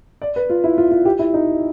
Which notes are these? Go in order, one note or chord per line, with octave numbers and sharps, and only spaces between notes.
D5
B4
F4
E4
F4
F4
G4
E4
D#4